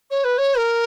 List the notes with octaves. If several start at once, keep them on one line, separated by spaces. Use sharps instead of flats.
C#5
B4
C#5
A#4